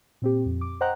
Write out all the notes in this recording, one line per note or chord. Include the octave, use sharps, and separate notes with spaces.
A#2 C4 G4
F2
D6
C5 D#5 F#5 G5 A#5 F#6